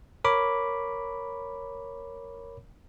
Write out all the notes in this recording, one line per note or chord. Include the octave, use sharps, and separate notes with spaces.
A#4 C#5 B5 D6